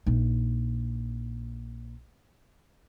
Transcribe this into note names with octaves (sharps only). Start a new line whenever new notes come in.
A#1 D#4